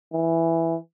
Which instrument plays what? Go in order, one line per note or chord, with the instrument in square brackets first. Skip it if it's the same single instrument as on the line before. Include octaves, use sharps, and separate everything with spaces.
[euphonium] E3